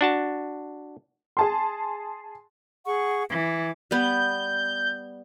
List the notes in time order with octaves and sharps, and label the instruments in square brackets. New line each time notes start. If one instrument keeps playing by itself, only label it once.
[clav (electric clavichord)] D4 F#4 A5
[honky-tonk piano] G#4 A5 C6
[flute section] G#4 F#5 C#6
[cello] E3 [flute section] D6 G#6
[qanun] G3 B3 [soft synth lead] G6